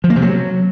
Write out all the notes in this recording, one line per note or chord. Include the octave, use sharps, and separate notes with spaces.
F3
A#3
C3
F#3